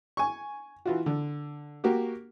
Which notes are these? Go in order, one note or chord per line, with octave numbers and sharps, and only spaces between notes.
G#5 C#6
E3 F4 F#4
D3
A#3 F#4 G4